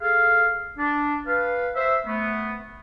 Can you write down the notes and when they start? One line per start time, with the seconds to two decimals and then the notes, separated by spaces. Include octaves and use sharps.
0.01 G#4 A4 F5
0.77 D4
1.26 B4 F5
1.75 C5 E5
2.06 A3 B3